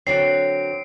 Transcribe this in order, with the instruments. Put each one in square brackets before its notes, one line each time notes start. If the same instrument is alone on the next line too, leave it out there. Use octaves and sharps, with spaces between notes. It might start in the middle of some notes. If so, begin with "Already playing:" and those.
[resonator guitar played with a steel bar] D3 F#3 C4 [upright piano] C#5 [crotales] C7 D7